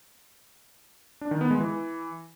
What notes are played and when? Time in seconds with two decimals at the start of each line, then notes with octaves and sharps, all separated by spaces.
1.21 D4
1.31 D#3
1.41 B3
1.51 G#3
1.60 E3